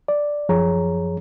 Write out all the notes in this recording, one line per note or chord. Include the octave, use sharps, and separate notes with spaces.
D5
F#2 F3 G#4 C#5 A#5